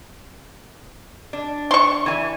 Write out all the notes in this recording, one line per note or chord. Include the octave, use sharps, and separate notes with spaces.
D4
C6 C#6
E3 G#5